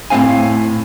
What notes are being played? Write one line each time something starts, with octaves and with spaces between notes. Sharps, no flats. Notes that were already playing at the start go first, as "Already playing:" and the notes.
A2 C4 C#4 F5 G#5